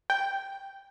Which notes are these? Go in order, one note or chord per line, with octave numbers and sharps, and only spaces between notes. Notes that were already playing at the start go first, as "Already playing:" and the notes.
G5